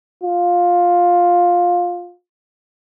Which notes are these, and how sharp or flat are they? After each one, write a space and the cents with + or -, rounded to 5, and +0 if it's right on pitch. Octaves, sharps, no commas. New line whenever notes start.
F4 +15